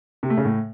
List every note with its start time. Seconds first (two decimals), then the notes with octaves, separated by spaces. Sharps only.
0.23 C3
0.30 A3
0.37 C#3
0.45 A2